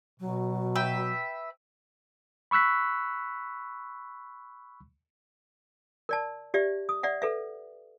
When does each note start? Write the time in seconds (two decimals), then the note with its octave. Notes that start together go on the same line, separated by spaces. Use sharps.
0.20 B2 F#3
0.76 B4 E5 G5
2.51 B5 C#6 E6 F#6 B6
6.09 A#4 D5 A5
6.54 G4 D5 E5
6.89 D#6
7.03 D5 E5 F#5
7.22 A4 B4 E5